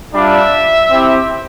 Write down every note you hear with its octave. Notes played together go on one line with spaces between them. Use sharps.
G3 D4 F4 E5
C4 E4 G4